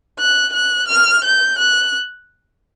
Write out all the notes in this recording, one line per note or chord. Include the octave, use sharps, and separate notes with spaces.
F#6
F#6
F6
G6
F#6